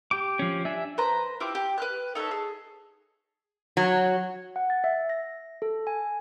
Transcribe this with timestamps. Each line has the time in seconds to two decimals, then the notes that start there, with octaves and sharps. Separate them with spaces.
0.11 G4 G5 D6
0.39 F3 C#4
0.65 D4 E5 G#5
0.98 B4 C5 A#5
1.40 E4 F4 G4 D6
1.55 G4
1.78 B4 F6 F#6
2.15 D#4 A4 C#5 E5
2.31 G#4
3.77 F#3
4.56 F#5
4.70 A6
4.84 E5
5.10 A#6
5.62 A4
5.87 G#5